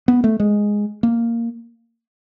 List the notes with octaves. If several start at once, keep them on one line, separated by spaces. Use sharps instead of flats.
B3
A3
G#3
A#3